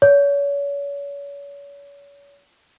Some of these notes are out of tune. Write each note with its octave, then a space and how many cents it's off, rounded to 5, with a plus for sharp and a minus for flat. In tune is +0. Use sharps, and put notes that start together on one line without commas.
C#5 +35